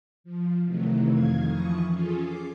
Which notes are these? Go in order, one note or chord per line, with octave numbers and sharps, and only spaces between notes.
F3
C3 D#3 E3 F#3 A3
F2 D#3 F5 G#6
E3 F3 C#6 D#6
C#4 F4 G#4 A4
D6 C7